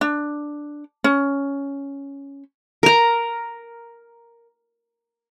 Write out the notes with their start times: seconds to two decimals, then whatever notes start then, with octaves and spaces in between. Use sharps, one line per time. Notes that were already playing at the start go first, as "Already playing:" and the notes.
0.01 D4
1.04 C#4
2.83 A#4 A#5